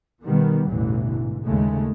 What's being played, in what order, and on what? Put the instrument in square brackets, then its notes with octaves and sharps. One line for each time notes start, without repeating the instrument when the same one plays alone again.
[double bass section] B2 D#3 G3 B3
A1 E2 G2 B2 D3 E3
G#2
D#2 C#3 G#3 A3